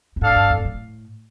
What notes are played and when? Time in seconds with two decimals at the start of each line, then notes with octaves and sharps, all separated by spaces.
0.16 G2
0.21 A2 D4 A4 F5
0.36 G2
0.50 F2
0.57 C3
0.65 A2